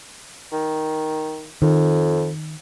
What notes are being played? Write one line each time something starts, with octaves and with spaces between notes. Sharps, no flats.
D#3
F2 D#3